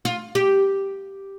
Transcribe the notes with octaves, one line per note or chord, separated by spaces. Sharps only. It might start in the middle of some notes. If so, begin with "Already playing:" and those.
F4
G4